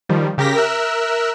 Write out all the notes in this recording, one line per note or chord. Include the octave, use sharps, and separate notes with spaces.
D#3 F3 G3
C#3 G4 A#4 A#6 B6
A#4 E5 E6 F#6